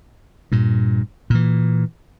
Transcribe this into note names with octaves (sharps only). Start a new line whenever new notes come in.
G2 A#2
A#2 E3